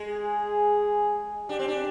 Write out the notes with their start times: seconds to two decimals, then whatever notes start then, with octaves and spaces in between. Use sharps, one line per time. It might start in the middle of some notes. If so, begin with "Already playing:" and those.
Already playing: G#3
0.09 G#4
1.49 D4 G4
1.59 C4
1.68 D4